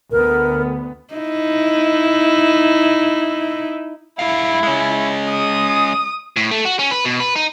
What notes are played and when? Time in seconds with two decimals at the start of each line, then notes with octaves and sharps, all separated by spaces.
0.11 D2 B3 A#4
1.14 D#4 E4
4.19 G2 E4 F5
4.63 G#3 C#4
5.29 D#6
6.36 A2
6.51 A3
6.65 F#4
6.79 C#4
6.91 B4
7.05 B2
7.20 B4
7.36 D#4